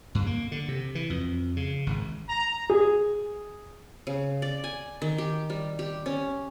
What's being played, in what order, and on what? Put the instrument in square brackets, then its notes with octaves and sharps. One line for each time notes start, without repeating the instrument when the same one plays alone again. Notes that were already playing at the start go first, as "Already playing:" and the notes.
[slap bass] G2
A#3
D3
C3
E3
F2
C#3
G#1
[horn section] A#5
[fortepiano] G#4
[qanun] C#3
D5
G#5
D#3
G4
G3
G4
C#4